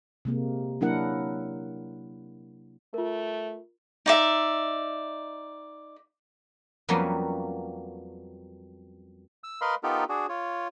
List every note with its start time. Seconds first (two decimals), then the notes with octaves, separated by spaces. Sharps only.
0.25 C3 G#3 A#3
0.81 F#3 A#3 D4 E4 A#4 F#5
2.94 A3 F4 A#4
4.06 D#4 D5 E5
6.89 F2 F#3 G3 A#3 B3 C#4
9.44 E6
9.61 A#4 B4 D#5 F5 B5 C6
9.83 B3 D#4 F4 G4 A4 A#4
10.09 D4 F#4 G#4
10.29 F4 C#5